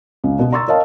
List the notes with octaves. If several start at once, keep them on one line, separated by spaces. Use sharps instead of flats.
C#2
B2
A#5 C6 C#6 E6 A6
A#4 C#5 D#5 F5 A5